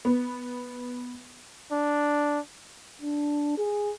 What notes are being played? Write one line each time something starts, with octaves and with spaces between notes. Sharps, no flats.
B3
D4
D4
G#4